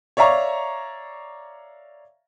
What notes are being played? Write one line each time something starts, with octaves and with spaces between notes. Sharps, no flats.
C#5 D5 E5 F5 A#5 C#6